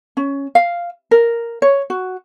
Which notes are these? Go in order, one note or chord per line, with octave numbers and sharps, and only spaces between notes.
C#4
F5
A#4
C#5
F#4